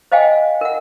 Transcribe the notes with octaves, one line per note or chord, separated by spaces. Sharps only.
C5 D#5 F5 G5 G#5
A#4 F#5